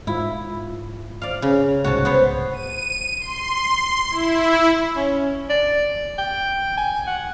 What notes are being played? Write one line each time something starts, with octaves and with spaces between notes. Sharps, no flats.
G#2 E4 F4
D5 F5
C#3
C2 G#2 G#3 F#4 C#5 A5
B3 C5 C#5
D#7
C6
E4
C#4
D5
G5
G#5
F#5